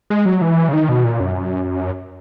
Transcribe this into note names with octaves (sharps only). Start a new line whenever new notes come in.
G#3
F#3
E3
C#3
D#3
B2
A#2
F#2